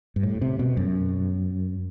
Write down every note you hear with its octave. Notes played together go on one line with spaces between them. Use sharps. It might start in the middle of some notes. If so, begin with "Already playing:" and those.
G2
A2
C3
B2
F#2